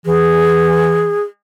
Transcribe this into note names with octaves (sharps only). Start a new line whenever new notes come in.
E3 G#4